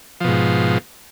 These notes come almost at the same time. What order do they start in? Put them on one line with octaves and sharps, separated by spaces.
F3 B2 G#2